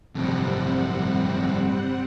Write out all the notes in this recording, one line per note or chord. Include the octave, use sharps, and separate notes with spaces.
G1 F2 A2 C3 F#3 G3 C4 F#5